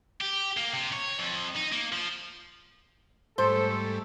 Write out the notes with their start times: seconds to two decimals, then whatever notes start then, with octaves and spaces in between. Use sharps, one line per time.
0.21 G4
0.57 A#3
0.73 C3
0.92 C#5
1.18 F2
1.56 D#4
1.72 A#3
1.92 F3
3.38 G#2 G3 A3 A4 C5